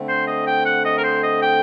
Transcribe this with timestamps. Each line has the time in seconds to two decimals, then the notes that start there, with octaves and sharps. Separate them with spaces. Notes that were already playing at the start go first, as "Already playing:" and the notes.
Already playing: D3 A3 C4
0.09 C5
0.27 D#5
0.47 G5
0.65 F#5
0.85 D#5
0.98 A#4
1.04 C5
1.23 D#5
1.42 G5